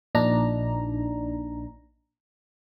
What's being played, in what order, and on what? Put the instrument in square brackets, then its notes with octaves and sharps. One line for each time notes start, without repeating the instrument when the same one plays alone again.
[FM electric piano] A#1 A#2 D4 D#4 A#5